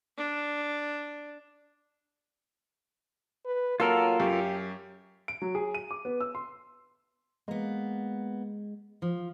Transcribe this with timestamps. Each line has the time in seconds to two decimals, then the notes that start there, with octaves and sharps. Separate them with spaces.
0.18 D4
3.46 B4
3.80 F#3 A#3 F4 A4 A#4
4.20 F#2 G4
5.28 D7
5.42 F#3
5.55 G#4
5.75 D#7
5.91 D6
6.05 B3
6.20 E6
6.35 C6
7.48 G#3 A#3 B3
9.02 F3